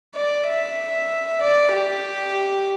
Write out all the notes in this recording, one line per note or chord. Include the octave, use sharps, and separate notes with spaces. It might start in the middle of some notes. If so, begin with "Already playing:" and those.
D5
E5
D5
G4